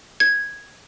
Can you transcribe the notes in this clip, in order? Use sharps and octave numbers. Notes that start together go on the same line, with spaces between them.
G#6